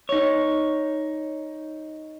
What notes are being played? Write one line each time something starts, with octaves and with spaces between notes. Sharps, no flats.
D#4 C#5